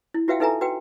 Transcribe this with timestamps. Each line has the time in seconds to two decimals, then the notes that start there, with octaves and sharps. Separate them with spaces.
0.14 E4
0.28 F4 F#4 B4 E5 F5 G5
0.40 D#4 A4 B4 E5 G#5 A#5
0.61 F#4 B4 G5